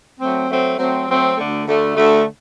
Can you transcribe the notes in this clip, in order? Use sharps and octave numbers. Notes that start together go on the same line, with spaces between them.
F#3 A3 C4
F#3 A3 C4
F#3 A3 C4
F#3 A3 C4
D2 D3 A3
D2 D3 A3
D2 D3 A3